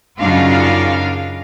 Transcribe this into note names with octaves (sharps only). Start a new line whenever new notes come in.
F#2 C#3 D4 D#4 F4 F5